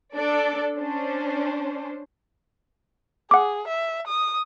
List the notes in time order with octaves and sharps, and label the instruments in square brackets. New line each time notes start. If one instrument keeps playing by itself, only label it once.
[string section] D4 A4 D5
C#4 D4 C5
[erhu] G#4 [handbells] F#5 D6
[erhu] E5
D#6